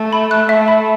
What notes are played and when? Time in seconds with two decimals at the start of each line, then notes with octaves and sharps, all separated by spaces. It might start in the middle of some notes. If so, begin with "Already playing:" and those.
Already playing: A3
0.13 B5
0.31 F#6
0.49 A3 E5
0.68 B5